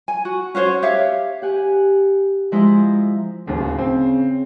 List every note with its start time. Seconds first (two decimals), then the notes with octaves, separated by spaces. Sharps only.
0.08 G#5
0.25 F#4
0.55 C#4 F#4 C5 C#5
0.82 G4 C#5 E5 F5
1.42 G4 F#5 G#5
2.52 F3 G#3 E4 C5 E5 A#5
3.47 D1 D#2 C#3
3.79 C4